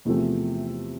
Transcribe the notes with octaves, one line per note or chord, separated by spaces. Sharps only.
E2 C3 F3 A3